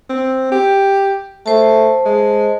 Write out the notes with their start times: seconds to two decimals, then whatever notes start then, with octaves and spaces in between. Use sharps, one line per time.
0.09 C4
0.51 G4
1.46 A3 C5 A5
2.05 G#3